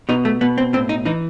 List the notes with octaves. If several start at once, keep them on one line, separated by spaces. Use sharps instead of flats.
B2 D#4
A3
B2 B3
C4
A2 C4
D#4
E3 D#4